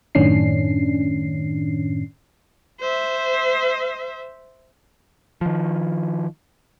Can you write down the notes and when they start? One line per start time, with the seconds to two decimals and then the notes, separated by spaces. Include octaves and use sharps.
0.15 F#2 A2 D#3 C#4 D4 C7
2.80 C5 E5
5.41 D#3 F3